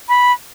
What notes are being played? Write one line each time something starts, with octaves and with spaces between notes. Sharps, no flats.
B5